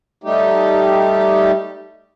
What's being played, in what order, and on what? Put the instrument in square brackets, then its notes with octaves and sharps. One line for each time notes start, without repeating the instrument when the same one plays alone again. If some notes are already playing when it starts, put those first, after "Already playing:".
[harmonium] G3 A3 D#4 G4